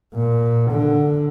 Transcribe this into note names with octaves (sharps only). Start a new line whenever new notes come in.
A#2
D3